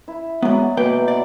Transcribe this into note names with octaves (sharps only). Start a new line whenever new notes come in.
E4
F#3 G#3 B3 D5
B2 A#3 B4 G5
D5